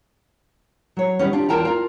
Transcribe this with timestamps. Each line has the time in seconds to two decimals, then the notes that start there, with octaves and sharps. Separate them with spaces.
0.97 F#3 C#5
1.19 D#3 G3 B3 C#4
1.33 D4 F4 G4
1.49 E2 F4 A#4 G5 A5 A#5
1.65 F4 A#4